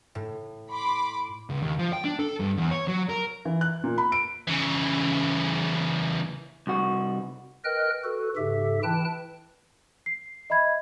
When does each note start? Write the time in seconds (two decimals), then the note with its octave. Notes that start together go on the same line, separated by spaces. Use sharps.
0.15 A2
0.71 B5 C6 D6
1.50 C#2
1.62 D#2
1.79 F3
1.93 G5
2.04 D4
2.19 A4
2.40 G2
2.58 E2
2.71 C#5
2.88 F#3
3.09 A#4
3.45 E3
3.61 F#6
3.84 A#2
3.98 B5
4.12 D7
4.48 C#3 E3
6.67 C2 F#4
7.65 A#4 B4 D#5 G5 F6 F#6
8.04 F#4 A4 B4
8.36 G#2 C#3 G4 A4 E5
8.83 E3 E4 G5 A5 F#6
10.06 C7
10.50 D#5 E5 B5 G#6